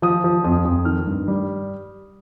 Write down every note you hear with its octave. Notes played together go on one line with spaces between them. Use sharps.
F3 D#6
F3
F2 D#6
F2
D#3 F6
G2
G3